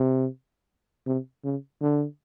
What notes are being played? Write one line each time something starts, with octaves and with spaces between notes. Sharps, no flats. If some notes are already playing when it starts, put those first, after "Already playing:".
Already playing: C3
C3
C#3
D3